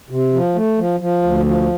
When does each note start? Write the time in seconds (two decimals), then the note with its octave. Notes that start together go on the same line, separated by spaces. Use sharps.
0.10 C3
0.33 F3
0.55 A3
0.78 F3
1.00 F3
1.23 D2
1.46 F3